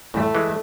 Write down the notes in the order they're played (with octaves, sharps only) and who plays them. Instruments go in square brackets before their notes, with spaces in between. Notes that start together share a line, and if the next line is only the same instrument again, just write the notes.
[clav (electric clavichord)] A2 [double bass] A3
[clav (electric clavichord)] E3 G#3